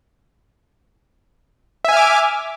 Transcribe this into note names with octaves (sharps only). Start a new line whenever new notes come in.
E5 G#5 D6 F6